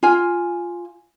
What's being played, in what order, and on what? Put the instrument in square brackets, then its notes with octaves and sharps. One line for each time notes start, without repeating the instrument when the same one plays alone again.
[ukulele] F4 G#5